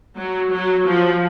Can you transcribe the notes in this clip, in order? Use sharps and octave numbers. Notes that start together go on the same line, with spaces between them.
F#3
F#3
F3